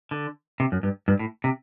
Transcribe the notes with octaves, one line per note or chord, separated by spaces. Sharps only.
D3
C3
F#2
G2
G2
A2
C3